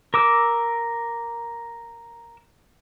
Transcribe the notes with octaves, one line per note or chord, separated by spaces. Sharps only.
A#4 D6 E6